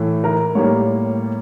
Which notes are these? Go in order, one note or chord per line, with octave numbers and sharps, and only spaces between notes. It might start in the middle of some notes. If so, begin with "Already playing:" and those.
Already playing: A2 E3 A3
A#4
A2 G3 A#3 C#5